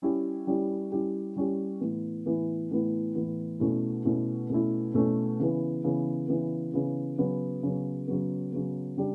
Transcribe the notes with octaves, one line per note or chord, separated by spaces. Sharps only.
G3 C#4 E4 G4
G3 C#4 E4 G4
G3 C#4 E4 G4
G3 C#4 E4 G4
A2 E3 B3
A2 E3 B3
A2 E3 B3
A2 E3 B3
B2 A3 C#4 E4
B2 A3 C#4 E4
B2 A3 C#4 E4
B2 A3 C#4 E4
C#3 E3 B3
C#3 E3 B3
C#3 E3 B3
C#3 E3 B3
C#3 F#3 B3
C#3 F#3 B3
C#3 F#3 B3
C#3 F#3 B3
C#3 G3 D4 G4